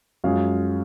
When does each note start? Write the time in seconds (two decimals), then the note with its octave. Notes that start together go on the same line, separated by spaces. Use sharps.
0.24 F#2 F3 G#3 F5